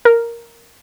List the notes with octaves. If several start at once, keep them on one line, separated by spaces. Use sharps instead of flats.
A#4